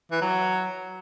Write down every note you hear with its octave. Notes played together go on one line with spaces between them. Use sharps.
E3
F#3